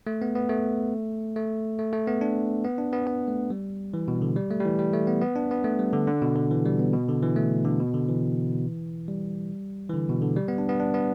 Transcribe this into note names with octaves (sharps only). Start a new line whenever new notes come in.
A3
B3
B3
A3
A3
A3
A3
B3
D4
B3
D4
B3
B3
A3
G3
E3
B2
D3
G3
A3
G3
E3
G3
A3
B3
B3
D4
B3
A3
G3
D3
D3
B2
D3
E3
G3
B3
B2
D3
E3
A3
D3
B2
D3
E3
G3
E3
D3
B2
D3
G3
B3
D4
B3
D4
B3